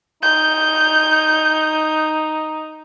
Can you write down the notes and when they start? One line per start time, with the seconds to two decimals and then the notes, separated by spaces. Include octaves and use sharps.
0.23 D#4 G6